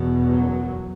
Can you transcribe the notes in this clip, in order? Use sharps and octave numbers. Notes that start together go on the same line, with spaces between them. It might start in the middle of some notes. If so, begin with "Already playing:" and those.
Already playing: E2 B2
F#2 F#3